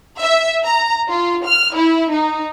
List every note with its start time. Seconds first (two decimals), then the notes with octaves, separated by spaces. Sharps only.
0.21 E5
0.66 A#5
1.10 F4
1.45 F6
1.75 E4
2.11 D#4